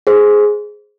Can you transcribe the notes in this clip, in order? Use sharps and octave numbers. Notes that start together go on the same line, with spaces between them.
G#4 C5